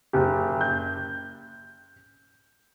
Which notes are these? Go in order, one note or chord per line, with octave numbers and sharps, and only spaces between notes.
F#1 G4
G6